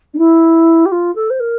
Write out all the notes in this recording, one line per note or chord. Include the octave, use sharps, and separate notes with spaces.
D4
E4
G4
F4
A4
C5
A#4